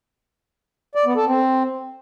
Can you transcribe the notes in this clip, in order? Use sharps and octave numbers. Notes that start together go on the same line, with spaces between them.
D5
B3
A4
C4